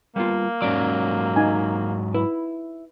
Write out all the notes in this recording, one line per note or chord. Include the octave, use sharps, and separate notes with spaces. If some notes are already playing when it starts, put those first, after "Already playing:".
G3 A#3 B3 F4
G#2 F#3 C#4 D5
D#4 G#5
E4 B4